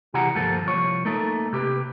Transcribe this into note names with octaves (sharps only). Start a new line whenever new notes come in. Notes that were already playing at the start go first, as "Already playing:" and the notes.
C3 E3 G4 G#4 F#5 A#5
D2 G2 F3 A#3 A4
C2 F3 C#5
A3 A#3 D#4 A4
C3 G4 B4